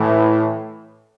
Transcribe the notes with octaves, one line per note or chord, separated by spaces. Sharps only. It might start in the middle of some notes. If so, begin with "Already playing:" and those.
Already playing: A2 E3